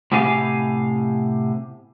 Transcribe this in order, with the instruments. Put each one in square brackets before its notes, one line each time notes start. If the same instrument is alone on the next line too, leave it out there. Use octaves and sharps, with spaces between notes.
[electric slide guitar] A2 C3 B3 G4 F5 G#5